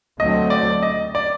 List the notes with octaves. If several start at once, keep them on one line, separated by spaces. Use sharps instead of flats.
D2 D3 F#3 A3 C4 D#5
D5
D#5
D5